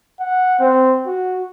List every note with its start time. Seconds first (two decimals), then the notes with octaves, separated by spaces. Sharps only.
0.20 F#5
0.59 C4
1.06 F#4